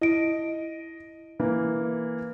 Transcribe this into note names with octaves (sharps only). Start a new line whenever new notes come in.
E4 D#5 D7
E3 A#3